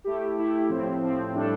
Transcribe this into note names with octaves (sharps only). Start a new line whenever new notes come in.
A3 E4 G4
A3 E4 G4
A2 F3 C4
A2 F3 C4
A2 G3 D4 A4